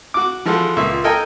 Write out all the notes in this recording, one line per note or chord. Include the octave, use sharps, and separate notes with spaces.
F#4 D6
E3 F3 G#3 F#4 A4
C#2 A#2 E5 C#6
A4 A#4 D#5 G5 G#5